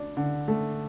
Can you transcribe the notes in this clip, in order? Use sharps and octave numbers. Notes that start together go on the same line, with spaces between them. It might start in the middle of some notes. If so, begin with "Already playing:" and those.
Already playing: D2 D4
D3
A3